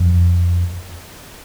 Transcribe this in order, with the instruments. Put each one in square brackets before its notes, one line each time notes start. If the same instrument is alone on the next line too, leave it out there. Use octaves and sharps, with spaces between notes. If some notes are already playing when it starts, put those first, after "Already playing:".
Already playing: [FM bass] F2